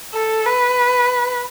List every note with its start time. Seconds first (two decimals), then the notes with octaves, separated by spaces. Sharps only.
0.14 A4
0.46 B4